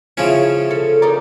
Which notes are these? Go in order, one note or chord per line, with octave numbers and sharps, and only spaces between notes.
C#3 F3 C#4 E4
A4
D#4 A#4 D5